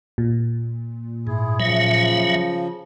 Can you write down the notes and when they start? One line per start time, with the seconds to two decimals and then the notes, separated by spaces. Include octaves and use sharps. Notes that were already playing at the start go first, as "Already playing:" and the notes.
0.18 A#2
1.27 G#2 E4 G#4
1.60 C#3 F3 F#3 E5